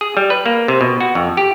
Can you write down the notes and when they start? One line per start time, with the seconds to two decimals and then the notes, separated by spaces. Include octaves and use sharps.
0.01 G#4
0.17 G3
0.30 B4
0.46 A#3
0.68 C3
0.81 B2
1.01 F#4
1.15 F2
1.37 G4